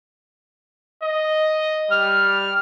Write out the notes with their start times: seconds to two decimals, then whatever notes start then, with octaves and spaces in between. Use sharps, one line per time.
1.03 D#5
1.91 G3 F6